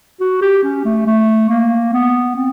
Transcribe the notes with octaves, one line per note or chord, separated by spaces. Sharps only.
F#4
G4
C#4
A3
A3
A#3
B3
C4